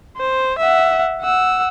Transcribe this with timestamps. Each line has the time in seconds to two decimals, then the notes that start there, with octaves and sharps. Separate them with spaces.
0.17 C5
0.58 E5 F#5
1.22 F#5 E6